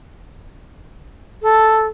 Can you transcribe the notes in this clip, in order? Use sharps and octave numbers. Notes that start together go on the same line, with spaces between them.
A4